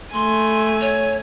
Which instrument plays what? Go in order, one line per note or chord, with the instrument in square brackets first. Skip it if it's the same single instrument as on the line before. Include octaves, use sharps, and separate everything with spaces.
[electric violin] A3 G#5 [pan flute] C6
[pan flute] C#5